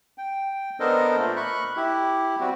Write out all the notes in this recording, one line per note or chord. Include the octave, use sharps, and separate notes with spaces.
G5
B3 D4 A4 A#4 C5 D#5
A#2 A3
B5 C#6 F#6
E4 G4
G3 C4 F#4